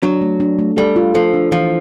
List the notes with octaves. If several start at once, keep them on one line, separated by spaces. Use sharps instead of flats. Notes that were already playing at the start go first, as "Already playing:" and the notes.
F#3 D4
A3
D4
A3
G3 A4
F4
F3 A4
D4
E3 F3